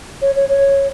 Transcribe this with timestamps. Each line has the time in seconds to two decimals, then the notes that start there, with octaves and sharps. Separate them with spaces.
0.21 C#5
0.36 C#5
0.49 C#5